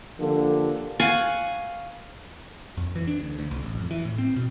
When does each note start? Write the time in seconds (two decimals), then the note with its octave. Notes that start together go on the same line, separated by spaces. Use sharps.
0.20 D3 F3 A#3 G4 A4
1.00 F5 F#5 G#5 C#6
2.77 F2
2.96 E3
3.07 D4
3.21 D2
3.39 D2
3.51 C2
3.63 A1
3.78 F2
3.91 E3
4.05 A2
4.18 C4
4.36 B2